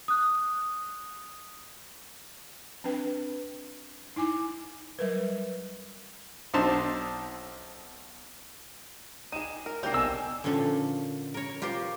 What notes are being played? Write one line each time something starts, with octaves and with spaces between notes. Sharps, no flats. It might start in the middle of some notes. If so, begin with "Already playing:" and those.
D#6 F#6
C4 D4 B4 G5
D#4 E4 G#5 D6
F#3 G3 A#4 B4
B1 C4 D4 D#4 A5 C6
D#4 G4 G#4 D#7 E7
A#4
C3 F#3 A#3 C4 D4 A#4 G6 C7
B1 G#5 E6 E7
A#2 D3 F3 C#4 A4
A#4 C#5
F4 G4 A#4 C5